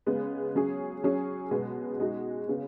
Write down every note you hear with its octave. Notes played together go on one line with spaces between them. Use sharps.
C#3 G#3 B3
F#3 C#4 G#4
F#3 C#4 G#4
B2 G#3 B3
G#3 D#4 F#4
C#3 B3 G#4